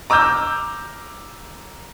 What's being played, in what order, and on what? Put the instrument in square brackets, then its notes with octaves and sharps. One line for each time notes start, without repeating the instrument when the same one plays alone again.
[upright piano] A#5 D6 E6 F6 G6